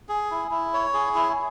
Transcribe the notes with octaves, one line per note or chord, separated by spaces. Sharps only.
G#4
E4
E4
C#5
G#4
E4